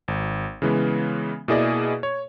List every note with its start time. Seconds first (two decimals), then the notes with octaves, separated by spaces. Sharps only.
0.08 G#1
0.62 C#3 E3 G#3 B3
1.48 B2 A#3 E4 G#4 D5 D#5
2.03 C#5